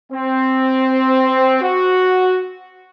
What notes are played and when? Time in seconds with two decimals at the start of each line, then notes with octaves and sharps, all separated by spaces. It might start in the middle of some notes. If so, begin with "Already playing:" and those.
0.13 C4
1.62 F#4